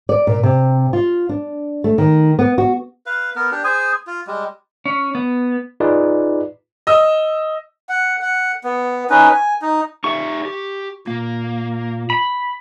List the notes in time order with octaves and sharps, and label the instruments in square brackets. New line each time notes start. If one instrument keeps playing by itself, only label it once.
[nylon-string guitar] D5
A#2
C3
F4
D4
A3
D#3
B3
F#4
[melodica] B4 F5
B3 A#4
D4 G4
G#4 C5 G#5
F4
G3 G#3
[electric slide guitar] C#4
B3
[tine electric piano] D#4 F4 G#4 B4 D5
[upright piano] D#5 E6
[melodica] F#5
F#5
B3
C#4 D#4 B4
G#5
D#4
[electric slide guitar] D#4 G4 E5 [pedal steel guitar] C#6
[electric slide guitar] G4
[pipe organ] A#2 [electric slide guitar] A#3
[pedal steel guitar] B5